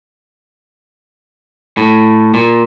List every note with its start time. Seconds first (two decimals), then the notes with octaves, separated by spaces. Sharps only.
1.77 A2
2.34 A#2